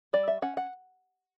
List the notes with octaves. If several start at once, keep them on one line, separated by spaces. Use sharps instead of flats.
G3 D5
E5
C#4 F#5
F#5